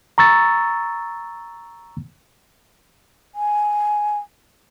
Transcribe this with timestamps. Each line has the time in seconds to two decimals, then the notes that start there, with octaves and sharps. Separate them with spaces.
0.18 A#5 C#6 E6 A6
3.34 G#5